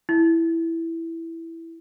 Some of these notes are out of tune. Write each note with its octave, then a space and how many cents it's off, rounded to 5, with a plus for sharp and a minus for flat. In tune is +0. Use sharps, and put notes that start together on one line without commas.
E4 +0